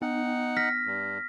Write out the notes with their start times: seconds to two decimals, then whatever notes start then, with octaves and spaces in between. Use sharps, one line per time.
0.02 B3 D#4 F#5
0.57 F6 A#6 B6
0.86 G2